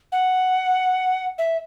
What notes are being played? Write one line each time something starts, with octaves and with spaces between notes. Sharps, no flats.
F#5
E5